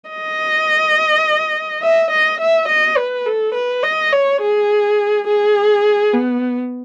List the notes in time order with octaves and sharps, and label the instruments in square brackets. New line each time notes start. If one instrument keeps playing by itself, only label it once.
[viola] D#5
E5
D#5
E5
D#5
B4
A4
B4
D#5
C#5
G#4
G#4
B3